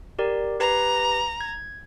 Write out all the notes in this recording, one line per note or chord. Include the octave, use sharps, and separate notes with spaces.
G4 A#4 D5
G4 B4 A#5
G#6